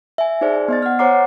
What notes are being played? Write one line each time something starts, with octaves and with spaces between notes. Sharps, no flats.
E5 G#5
D#4 G#4 C5 D5
B3 D#5 A6
F#5 F6
C5 C#5 F#5 A#5 D6 C7